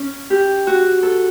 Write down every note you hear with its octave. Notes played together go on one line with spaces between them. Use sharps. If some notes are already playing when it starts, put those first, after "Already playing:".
Already playing: C#4
G4
F#4
A4